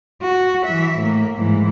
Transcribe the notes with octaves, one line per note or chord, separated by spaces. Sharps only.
F#4
E3 E5
A2 A#3
G#2 E3